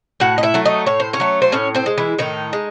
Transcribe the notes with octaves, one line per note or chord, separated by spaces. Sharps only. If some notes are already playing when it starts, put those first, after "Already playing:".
A2 F#4 F#5
D#5
E4 E5
F#3 A3
D#4 D#5
A2 C#5
C5
C#4 C#5
F#3 A3
C5
A2 C#4 C#5
C4 C5
G#3
E3 E4
A2 D#3 D#4
G#3